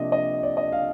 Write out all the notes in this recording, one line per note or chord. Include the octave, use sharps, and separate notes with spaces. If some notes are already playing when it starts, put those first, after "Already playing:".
Already playing: C3 F3 A#3 D4 D#5
D#5
D5
D#5
F5